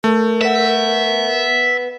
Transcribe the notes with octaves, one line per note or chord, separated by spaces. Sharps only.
A3 A#4
B4 E5 F#5